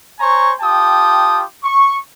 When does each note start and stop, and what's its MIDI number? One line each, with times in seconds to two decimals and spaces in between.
0.19 0.51 72
0.19 0.51 73
0.19 0.51 80
0.19 0.51 82
0.19 0.51 85
0.61 1.42 65
0.61 1.42 67
0.61 1.42 79
0.61 1.42 81
0.61 1.42 87
1.64 1.96 85